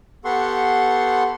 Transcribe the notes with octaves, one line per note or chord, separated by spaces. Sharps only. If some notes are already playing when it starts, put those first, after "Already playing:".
B3 G4 A4 F#5 C6 C#6